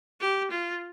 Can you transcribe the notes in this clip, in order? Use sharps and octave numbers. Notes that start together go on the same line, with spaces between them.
G4
F4